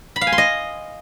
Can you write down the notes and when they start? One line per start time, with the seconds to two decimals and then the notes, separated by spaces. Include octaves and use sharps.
0.16 B5
0.21 F5
0.27 G#5
0.32 C6
0.38 D#5